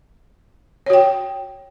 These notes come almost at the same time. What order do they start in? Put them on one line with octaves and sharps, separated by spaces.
C#5 F#4 G5